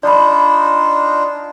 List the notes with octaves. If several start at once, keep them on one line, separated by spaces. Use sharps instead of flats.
D4 D#4 F4 D5 B5